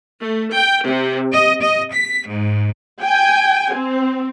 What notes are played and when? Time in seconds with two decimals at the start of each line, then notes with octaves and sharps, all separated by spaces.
0.21 A3
0.54 G5
0.86 C3
1.32 D#5
1.62 D#5
1.92 B6
2.26 G#2
3.02 G5 G#5
3.74 C4